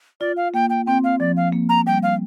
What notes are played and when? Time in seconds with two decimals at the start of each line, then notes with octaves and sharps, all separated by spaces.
0.21 F4 D5
0.37 F5
0.54 A#3 G5
0.70 G5
0.87 C4 G5
1.04 F5
1.20 F3 D5
1.37 F5
1.52 A#3
1.69 A#5
1.87 G3 G5
2.03 F5